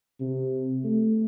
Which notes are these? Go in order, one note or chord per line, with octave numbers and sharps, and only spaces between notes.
C3
A3